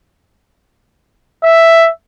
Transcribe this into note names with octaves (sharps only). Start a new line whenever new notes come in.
E5